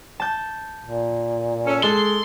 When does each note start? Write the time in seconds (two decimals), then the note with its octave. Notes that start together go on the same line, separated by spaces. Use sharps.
0.20 A5 G6
0.84 A#2
1.67 C#4 A4
1.83 G#3 A4 C6